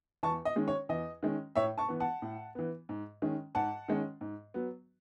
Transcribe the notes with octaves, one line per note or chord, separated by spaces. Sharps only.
E2 A5 C#6
D#5
D#3 G#3 C#4
C#5
E2 D#5
D#3 G#3 C#4
A2 C#5 E5
A5 C#6
E3 B3
F#5 A5
A2
E3 B3
G#2
D#3 G#3 C#4
G#2 F#5 A5
D#3 G#3 C#4
G#2
F#3 B3